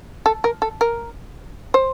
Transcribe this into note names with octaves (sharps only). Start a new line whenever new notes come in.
A4
A#4
A4
A#4
C5